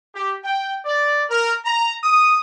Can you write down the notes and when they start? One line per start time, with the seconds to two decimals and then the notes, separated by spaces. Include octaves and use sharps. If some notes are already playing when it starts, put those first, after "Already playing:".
0.15 G4
0.44 G5
0.85 D5
1.30 A#4
1.65 A#5
2.03 D#6